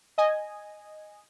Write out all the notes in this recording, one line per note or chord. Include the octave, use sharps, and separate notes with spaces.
D#5 G#5